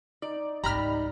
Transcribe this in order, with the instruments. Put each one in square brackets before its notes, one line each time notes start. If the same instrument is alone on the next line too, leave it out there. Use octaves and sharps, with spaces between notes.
[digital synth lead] D#4 [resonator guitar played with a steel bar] D5
[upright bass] G#1 C#2 [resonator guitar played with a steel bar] G3 [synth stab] A#5 B5 F6